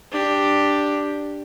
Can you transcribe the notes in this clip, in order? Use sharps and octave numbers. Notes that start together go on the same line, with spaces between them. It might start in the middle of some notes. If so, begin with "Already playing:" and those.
D4 G4